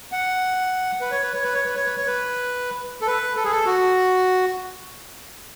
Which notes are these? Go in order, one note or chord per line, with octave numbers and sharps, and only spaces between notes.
F#5
B4
C#5
B4
C#5
B4
C#5
B4
C#5
B4
C#5
B4
A4
B4
A4
G#4
A4
F#4